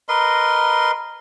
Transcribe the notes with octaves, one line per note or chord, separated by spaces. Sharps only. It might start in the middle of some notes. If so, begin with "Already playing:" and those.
A#4 B4 D#5 C6